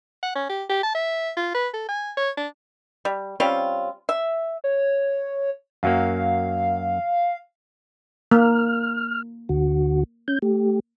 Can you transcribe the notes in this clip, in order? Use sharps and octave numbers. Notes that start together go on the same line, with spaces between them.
F#5
C#4
G4
G4
A5
E5
F4
B4
A4
G#5
C#5
D4
G3
G3 C4 C#4 F4
E5
C#5
F#2 F#3 A#3 F5
A#3 F6
D2 D3 F#4
C#4 G6
A3 G4